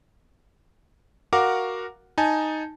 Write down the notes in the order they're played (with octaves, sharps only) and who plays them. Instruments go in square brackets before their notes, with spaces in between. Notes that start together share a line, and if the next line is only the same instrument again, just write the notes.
[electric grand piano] F#4 A#4 F5 F#5 D6
D#4 G#5 A5